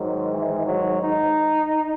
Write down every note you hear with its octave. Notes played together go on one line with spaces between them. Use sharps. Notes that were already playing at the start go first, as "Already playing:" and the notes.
Already playing: G#2 D#3 F#3
E3
F#3
D#4